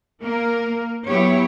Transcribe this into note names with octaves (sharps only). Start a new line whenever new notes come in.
A#3 A#4
F#3 B3 E4 G4 C#5